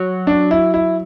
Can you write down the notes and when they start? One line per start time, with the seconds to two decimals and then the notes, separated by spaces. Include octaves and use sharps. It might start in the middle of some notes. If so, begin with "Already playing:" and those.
Already playing: F#3
0.27 D4
0.51 E4
0.74 E4